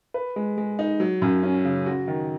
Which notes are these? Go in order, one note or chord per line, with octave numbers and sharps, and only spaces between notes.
B4
G#3
G#3
D#4
F#3
F#2
C#4
C#3
F#4
D#3